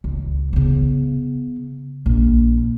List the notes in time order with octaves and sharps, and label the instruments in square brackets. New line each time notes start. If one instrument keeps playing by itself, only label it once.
[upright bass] C#2
C#3 B3
A#1